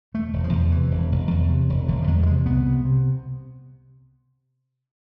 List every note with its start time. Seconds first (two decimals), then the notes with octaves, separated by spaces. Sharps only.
0.14 E1 A3
0.33 E1
0.44 F3
0.53 E2
0.72 C3 E3
0.91 E1
1.11 E1
1.31 E2
1.50 C3
1.70 E1
1.88 E1 D3
2.02 F3
2.07 E2 G#3
2.21 F3
2.27 C3 G#3
2.46 C2 B3
2.66 C3
2.85 C3